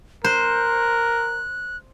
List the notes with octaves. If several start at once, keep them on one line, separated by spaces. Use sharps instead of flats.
A#4 C5 F#6